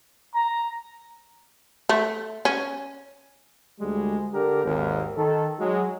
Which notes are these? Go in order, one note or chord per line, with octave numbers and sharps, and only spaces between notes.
A#5
A3
C#4
D2 G3 G#3
D3 G4 A#4
G#1 D#2
D#3 A4
F#3 G#3